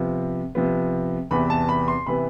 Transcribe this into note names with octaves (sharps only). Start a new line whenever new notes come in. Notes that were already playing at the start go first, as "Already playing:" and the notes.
Already playing: C3 F3 B3
C3 F3 B3
E2 C3 E3 B3 B5
A5
B5
C6
C3 E3 B3 B5